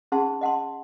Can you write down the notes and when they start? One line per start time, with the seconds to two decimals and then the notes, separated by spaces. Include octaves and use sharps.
0.12 C#4 D#4 G#4 F#5 A5 C6
0.41 D#5 F#5 A5 C6